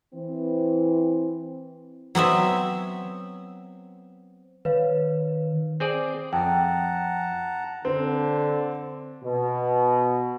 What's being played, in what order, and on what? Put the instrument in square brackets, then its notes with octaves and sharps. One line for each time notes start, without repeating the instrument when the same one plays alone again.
[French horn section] E3 C4
[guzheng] F#3 B3 C4 E5
[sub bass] D#3 [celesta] B4 C#5 F5
[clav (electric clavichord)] C4 G#4 D5
[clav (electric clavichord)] F2 [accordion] F#5 A5 A#5 [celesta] G5
[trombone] D3 [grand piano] C4
[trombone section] B2